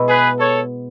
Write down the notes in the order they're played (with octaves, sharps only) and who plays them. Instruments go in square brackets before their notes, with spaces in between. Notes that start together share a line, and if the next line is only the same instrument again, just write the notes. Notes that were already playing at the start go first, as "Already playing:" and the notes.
Already playing: [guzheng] B2 G#3 B3 E4
[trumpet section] G#4 B4
A4 C#5